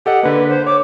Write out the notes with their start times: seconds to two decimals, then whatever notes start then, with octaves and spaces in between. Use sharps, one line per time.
0.06 G4 A4 D#5 F#5
0.23 D3 A#3 B4
0.49 C5
0.67 C#5 D6